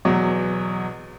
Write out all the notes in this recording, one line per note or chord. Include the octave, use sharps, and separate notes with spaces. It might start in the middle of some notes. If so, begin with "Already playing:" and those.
E2 B2 F#3